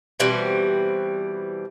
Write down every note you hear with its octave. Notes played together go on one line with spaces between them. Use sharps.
B2 E3 G3 C4